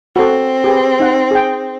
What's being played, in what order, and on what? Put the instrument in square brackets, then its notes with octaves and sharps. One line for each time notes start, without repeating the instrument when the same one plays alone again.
[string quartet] C4 [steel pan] F#4 A4
[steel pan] G4 G#4 B4
D#4 F#5
G#4 G5